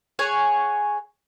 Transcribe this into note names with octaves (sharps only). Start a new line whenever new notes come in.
G#4 C#5 F#5 G#5